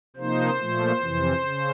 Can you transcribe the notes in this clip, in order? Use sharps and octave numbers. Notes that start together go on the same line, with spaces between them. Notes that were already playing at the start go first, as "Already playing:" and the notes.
C3 F3 A#3 D#4 C5
A#2 F3 A3
F2 C3 E3
C#3